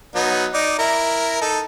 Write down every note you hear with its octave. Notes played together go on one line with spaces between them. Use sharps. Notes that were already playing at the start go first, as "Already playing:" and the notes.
F#3 B3 D#4
D#4 D5
E4 A#4
D#4 A4